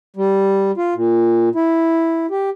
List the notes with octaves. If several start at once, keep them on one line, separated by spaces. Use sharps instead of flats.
G3
F4
A#2
E4
G4